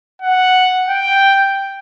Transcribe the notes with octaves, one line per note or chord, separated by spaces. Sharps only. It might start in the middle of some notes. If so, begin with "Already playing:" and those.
F#5
G5